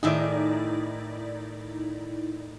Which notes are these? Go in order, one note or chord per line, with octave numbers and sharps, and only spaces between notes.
A2 D#3 D#4 E4 G#4 D5